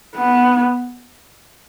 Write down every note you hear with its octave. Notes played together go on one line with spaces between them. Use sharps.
B3